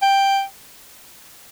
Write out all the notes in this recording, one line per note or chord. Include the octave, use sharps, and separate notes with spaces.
G5